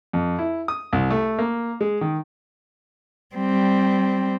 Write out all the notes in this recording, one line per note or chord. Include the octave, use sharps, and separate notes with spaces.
F2
E4
D#6
C2
A3
A#3
G#3
D#3
G3 C4